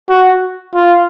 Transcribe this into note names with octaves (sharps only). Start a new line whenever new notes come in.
F#4
F4